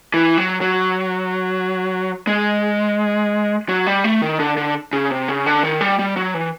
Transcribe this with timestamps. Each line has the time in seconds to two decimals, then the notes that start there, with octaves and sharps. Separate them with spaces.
0.14 E3
0.38 F#3
0.61 F#3
2.27 G#3
3.69 F#3
3.87 G3
4.04 A3
4.22 D#3
4.40 D3
4.57 D3
4.93 C#3
5.11 C3
5.28 C#3
5.46 D3
5.63 D#3
5.81 G3
5.99 G3
6.16 F#3
6.34 E3